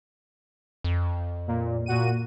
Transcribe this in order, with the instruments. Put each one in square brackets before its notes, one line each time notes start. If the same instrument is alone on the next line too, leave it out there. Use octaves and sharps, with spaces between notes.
[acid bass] F2
[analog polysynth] A#2
A#2 F#4 D#7